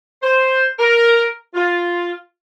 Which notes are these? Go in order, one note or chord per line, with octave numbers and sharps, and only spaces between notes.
C5
A#4
F4